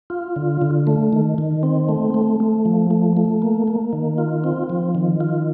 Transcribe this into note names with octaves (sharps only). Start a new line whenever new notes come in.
F4
D3
D3
A3
D#3
D#3
C4
A3
A3
A3
F3
A3
A3
A#3
A#3
D#3
F4
C4
F3
D#3
F4